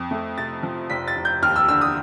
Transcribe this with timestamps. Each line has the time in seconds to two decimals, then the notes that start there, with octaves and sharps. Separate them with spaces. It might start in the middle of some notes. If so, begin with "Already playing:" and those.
Already playing: F2
0.11 A3
0.38 C3 A6
0.63 F3
0.90 F1 B6
1.08 A6
1.17 F1
1.25 G6
1.42 D#2 F6
1.56 E6
1.69 D3 E6
1.81 D#6